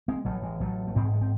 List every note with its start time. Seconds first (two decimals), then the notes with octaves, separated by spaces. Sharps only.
0.08 G#3 C4
0.25 A1 F#3 A3
0.42 E3 G#3
0.60 A1 F#3 A3
0.87 A3
0.95 G#2 G#3 C4
1.13 A3
1.21 C4